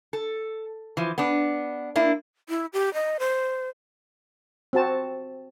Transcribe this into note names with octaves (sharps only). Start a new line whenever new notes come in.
A4
E3 F3
B3 D4
A#3 D4 E4
E4
G4
D#5
C5
C4 F#4 A5